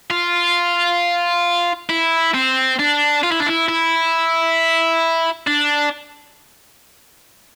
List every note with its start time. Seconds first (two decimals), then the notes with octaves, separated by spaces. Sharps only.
0.11 F4
1.89 E4
2.34 C4
2.79 D4
3.24 F4
3.32 E4
3.40 D4
3.47 E4
3.68 E4
5.47 D4